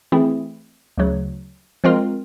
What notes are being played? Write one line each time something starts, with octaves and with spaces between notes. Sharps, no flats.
E3 A3 C4 E4 G#4
D2 C#3 F#3
F3 G#3 C4 F4 A#4